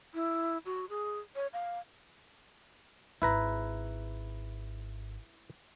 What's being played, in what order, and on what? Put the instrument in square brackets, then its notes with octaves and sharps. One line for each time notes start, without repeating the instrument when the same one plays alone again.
[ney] E4
F#4
G#4
C#5
F5
[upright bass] G#1 [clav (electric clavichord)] E4 B4 A#5